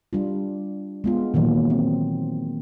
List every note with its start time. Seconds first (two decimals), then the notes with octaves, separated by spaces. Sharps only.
0.13 G3 D4 F4
1.04 G#3 B3 F4
1.34 A#2 D#3 E3 F#3 A#3
1.70 C4